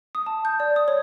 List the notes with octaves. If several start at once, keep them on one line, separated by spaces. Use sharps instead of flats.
D#6
A5
G6
D5
D#6
C#5